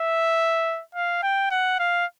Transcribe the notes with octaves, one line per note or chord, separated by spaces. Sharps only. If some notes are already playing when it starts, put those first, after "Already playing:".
Already playing: E5
F5
G5
F#5
F5